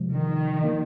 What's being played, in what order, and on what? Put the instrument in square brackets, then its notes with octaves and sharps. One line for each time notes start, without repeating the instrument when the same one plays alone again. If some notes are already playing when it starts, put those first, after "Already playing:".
Already playing: [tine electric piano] C3 F3 G#3
[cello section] D#3
[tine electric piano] F3 A#3 D#4 A#4